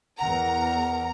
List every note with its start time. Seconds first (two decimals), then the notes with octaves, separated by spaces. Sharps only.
0.19 E2 A#4 F#5 A#5